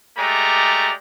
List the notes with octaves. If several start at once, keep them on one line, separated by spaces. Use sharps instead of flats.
G#3 A3 G4 D5 A#5